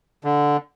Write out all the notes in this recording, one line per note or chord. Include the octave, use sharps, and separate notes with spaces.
D3